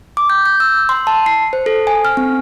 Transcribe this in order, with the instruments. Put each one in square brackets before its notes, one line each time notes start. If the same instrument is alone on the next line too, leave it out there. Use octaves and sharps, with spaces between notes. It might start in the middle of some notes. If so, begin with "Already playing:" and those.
[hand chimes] D6
G6
G6
E6
C6
A5
C7
C5
A4
G#5
F6
C4